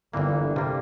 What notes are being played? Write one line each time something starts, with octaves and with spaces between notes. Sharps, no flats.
G1 G2 D3 E3 A#3
C3 G3 A#3